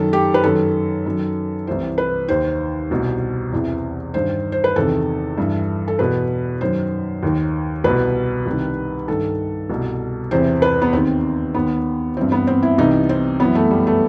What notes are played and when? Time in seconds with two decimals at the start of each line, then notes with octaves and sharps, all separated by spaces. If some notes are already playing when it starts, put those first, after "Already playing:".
Already playing: F#2 D#3 A4
0.13 G4
0.34 B4
0.43 F#2 D#3 A4
1.06 F#2 D#3
1.67 C2 C3 E3 C5
1.98 B4
2.28 D#2 D#3 C5
2.91 C2 B2
3.52 E2 C3 E3
4.14 G2 D#3 C5
4.52 C5
4.64 B4
4.76 E2 C3 D#3 A4
5.38 G2 E3
5.88 A4
5.99 E2 B2 B4
6.61 F#2 D#3 C5
7.23 D#2 D#3
7.84 C2 B2 B4
8.46 C2 C3 D#3
9.08 G2 D#3 A4
9.70 C2 B2
10.31 E2 C3 E3 C5
10.62 B4
10.82 B3
10.93 D#2 D#3 C4
11.55 D#2 D#3 B3
12.17 G2 E3 C4
12.32 B3
12.47 C4
12.63 E4
12.78 C2 C3 E3 D#4
13.09 C4
13.40 F#2 E3 B3
13.55 A3
13.71 G3
13.87 A3